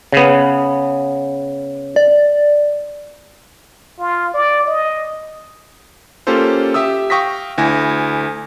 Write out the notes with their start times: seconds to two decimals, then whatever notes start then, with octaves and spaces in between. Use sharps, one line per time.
0.12 C#3 B3
1.96 D5
3.99 F4
4.34 D5
4.67 D#5
6.27 A#3 C#4 F4 G4 A4 C5
6.74 G4 E5 D#6 E6
7.10 F5 G5 C#6 D#6 A#6 B6
7.58 D2 E4 G#5 A#6